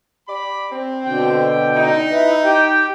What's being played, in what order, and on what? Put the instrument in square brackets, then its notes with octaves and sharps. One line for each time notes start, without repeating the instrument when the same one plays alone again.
[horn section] G4 D5 B5
C4
[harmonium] B2 D3 G5
[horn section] D#4
[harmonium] E4 B4
G4 G5